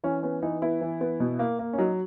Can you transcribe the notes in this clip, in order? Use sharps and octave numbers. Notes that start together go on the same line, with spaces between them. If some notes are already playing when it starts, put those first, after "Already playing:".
E3 C#4
B3 C#4
E3 D#4
B3 E4
E3
B3
B2
A#3
A#3
C#4
F#3 D#4